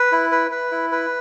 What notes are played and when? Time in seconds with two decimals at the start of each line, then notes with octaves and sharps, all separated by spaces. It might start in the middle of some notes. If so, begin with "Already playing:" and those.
Already playing: B4
0.12 E4
0.32 B4
0.51 B4
0.72 E4
0.92 B4